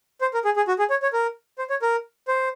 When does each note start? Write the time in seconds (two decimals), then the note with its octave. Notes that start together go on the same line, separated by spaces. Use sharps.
0.21 C5
0.34 A#4
0.45 G#4
0.56 G#4
0.68 F#4
0.79 G#4
0.90 C#5
1.02 C#5
1.13 A#4
1.58 C5
1.70 C#5
1.82 A#4
2.28 C5